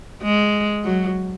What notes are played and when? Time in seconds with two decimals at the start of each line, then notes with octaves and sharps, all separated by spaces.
0.23 G#3
0.85 F#3